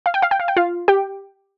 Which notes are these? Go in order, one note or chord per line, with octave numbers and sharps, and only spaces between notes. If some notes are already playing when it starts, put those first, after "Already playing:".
F5
G5
F5
G5
F5
G5
F4 F5
G4 G5